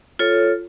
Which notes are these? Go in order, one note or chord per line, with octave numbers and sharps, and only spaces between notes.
F4 A4 C#5